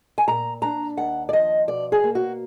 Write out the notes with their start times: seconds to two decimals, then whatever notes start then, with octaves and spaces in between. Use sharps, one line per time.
0.18 G#5
0.27 A#2 A#5
0.62 D4 A#5
0.98 D#2 F#5
1.29 D5
1.33 F3 D#5
1.68 B2 D5
1.92 G#4
2.04 A#3
2.15 F#4